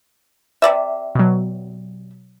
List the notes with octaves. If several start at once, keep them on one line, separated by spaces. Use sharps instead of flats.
C3 D5 E5
B2 F#3